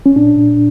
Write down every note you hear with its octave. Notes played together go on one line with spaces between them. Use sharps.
C#4
A#2 D4
A#2